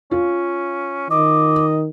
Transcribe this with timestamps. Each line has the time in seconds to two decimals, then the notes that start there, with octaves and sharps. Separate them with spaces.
0.11 C#4 F4
1.10 D#3 D#5 D6